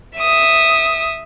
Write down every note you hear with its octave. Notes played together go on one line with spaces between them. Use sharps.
E5 D#6